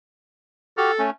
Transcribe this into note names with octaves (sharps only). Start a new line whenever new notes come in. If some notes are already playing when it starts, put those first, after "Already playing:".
F#4 G4 A4 F6
A3 C#4